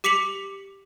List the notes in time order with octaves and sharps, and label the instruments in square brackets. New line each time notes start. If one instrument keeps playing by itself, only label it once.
[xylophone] G4 D6 B6 C#7 F7 F#7